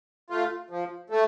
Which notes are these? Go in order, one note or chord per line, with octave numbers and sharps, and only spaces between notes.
A3 F4
F3
A3